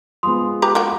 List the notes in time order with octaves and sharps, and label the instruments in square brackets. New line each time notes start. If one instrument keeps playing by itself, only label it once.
[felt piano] F3 G#3 B3 [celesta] C6 D#6
[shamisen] G4 B4 A#5
A#3 F#4 G5